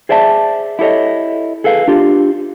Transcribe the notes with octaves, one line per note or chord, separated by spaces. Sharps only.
G#4 C5 D5 E5 A5
E4 G4 A4 C#5 D#5
G#4 A4 B4 F5
D4 F4 G4